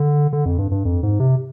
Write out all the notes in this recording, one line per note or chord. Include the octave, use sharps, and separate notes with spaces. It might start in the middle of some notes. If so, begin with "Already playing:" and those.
Already playing: D3
D3
F2
G2
G2
F2
G#2
C3